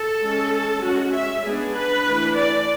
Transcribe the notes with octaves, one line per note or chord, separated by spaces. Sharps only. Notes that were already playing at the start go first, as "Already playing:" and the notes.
Already playing: A4
G#3 C#4
G#3 C#4 F#4
E5
G#3 B3 D4 G#4
B4
E3 A3 D4
D5